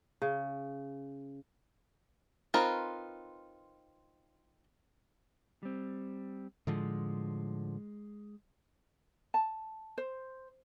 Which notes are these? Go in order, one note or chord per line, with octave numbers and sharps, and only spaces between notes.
C#3
C4 D#4 F4 A#4 B4
G3 C4
A2 D3 F3 G#3
A5
C5